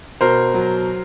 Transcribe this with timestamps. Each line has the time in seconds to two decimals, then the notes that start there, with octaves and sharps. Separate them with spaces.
0.21 B2 A#4 C5
0.54 F#3